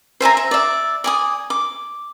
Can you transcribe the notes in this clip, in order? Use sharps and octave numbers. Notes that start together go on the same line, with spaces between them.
C5 E5 G#5 A#5
E5
D5 E5
D5 G#5 D#6
D6